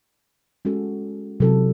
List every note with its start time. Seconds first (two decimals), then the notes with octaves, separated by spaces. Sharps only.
0.65 G#3 C#4 F#4 A4
1.40 C3 F#3 C4 E4 A4